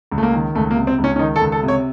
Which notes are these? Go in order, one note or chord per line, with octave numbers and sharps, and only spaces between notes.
C#2
A3
A#3
D#3
C#2 A3
A#3
C3
C4
C#2
C#4
C#4
D#3 D#4
A4
C#2
A4
C3
C#5